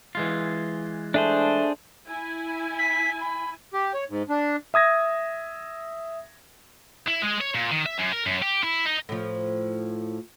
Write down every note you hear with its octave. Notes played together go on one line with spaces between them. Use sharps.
E3 G#3 F4
A3 D4 G#4 C5
E4 G#5
B6
B5
G4
C#5
G#2
D4
E5 D#6 G#6 A#6
E4
G#3
C#5
A#2
D#3
E5
F#2
A#4
F#2
G4
E4
D#4
A2 F3